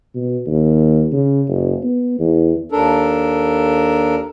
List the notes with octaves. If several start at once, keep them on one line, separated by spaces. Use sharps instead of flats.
B2
D#2
C#3
F#1
B3
E2
D#2 D4 A4 A#4